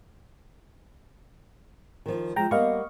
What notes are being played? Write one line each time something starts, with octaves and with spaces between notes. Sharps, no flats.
D#3 F3
F3 G#3 G5 A#5
G3 A#3 B3 D#5 F5 C#6